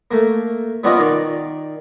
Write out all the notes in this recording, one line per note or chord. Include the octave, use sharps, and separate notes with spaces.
A3 A#3
G3 B3 C#4 F4 D5 D#5
D#3 D5